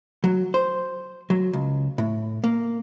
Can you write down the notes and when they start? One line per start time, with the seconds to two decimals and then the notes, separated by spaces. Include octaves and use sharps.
0.24 F#3
0.54 C5
1.30 F#3
1.53 C#2
1.98 A2
2.44 A#3